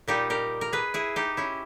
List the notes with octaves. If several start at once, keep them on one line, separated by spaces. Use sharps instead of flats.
A#2 G3 D#4 G4
G4 A#4
A#4
G#4 B4
E4 G#4
D#4 G4
C#4 E4